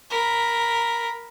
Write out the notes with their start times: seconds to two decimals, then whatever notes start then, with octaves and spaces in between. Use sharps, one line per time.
0.11 A#4 B5